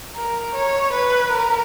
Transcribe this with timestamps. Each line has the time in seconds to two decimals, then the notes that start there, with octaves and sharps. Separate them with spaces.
0.16 A#4
0.55 C#5
0.93 B4
1.31 A#4